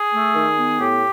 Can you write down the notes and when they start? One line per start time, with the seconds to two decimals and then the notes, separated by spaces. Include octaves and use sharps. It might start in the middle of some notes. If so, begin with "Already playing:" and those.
Already playing: G#4
0.13 A3
0.35 D#3
0.57 B3
0.78 A2 G4